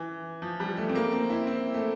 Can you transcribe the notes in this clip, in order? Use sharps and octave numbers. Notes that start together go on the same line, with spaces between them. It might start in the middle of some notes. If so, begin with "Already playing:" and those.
Already playing: E3
F3
G3
A3
C4
A#3
C4
E4
C4
A3